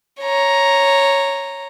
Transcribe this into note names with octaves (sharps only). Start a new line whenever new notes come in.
C#5 A#5